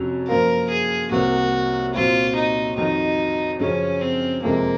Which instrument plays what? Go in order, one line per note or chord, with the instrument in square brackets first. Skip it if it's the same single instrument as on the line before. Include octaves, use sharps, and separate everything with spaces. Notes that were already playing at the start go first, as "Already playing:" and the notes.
Already playing: [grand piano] F2 C3 F#3 C#4
[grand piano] F#2 F3 A#3 F4 [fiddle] A#4
[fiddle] G#4
[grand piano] C2 C3 F#3 A#3 [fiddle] F#4
[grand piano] A#2 F#3 C4 F#4 [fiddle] F4
[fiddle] D#4
[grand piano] F2 D#3 F#3 [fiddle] D#4
[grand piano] F#2 C#3 F3 [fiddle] C#4
[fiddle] C4
[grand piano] F#1 F2 C3 F3 G#3 [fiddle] A#3